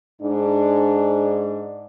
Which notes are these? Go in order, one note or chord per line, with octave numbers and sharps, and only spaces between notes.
G#2 D4